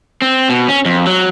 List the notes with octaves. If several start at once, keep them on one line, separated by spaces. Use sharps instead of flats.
C4
B2
C#4
F2
F#3